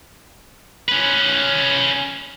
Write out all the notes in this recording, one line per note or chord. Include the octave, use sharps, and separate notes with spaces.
C#4 B4